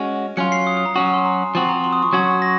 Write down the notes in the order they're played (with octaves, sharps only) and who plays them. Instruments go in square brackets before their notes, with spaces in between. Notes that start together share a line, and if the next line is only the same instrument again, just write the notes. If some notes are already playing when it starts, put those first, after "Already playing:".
Already playing: [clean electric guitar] G#3 C#4 F#4
[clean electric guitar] F#3 C#4 F4 [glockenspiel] C#7
[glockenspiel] C7
D#6
D#6
A#5
[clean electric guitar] F#3 C#4 F#4 [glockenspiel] G#5
[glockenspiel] C6
A#5
[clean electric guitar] F3 C4 F#4 [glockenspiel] C6
[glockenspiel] A#5
C6
D#6
C#6
[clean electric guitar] F#3 C#4 F#4 [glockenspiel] G#6
[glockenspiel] A#6